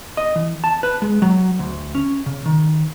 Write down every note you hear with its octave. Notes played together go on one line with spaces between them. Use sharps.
D#5
E3
A5
B4
G#3
F#3
D2
C#4
C#3
D#3